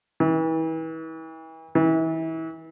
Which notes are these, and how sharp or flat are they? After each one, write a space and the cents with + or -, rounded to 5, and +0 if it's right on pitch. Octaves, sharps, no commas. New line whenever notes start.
E3 -35
E3 -30